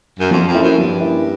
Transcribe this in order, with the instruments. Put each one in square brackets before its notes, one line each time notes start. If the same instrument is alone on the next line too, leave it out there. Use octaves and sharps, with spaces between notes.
[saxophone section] F#2
[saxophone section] F2 [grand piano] F3
[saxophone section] F2
[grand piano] A#3 C#4 E4
[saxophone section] F#2
[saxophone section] G2 [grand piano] F3
[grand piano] A#3 C#4 E4